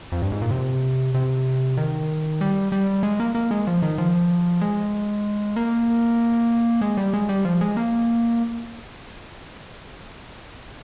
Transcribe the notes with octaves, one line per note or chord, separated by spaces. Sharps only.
F2
G2
G#2
A#2
C3
C3
D#3
G3
G3
G#3
A#3
A#3
G#3
F3
D#3
F3
G#3
A#3
G#3
G3
G#3
G3
F3
G#3
A#3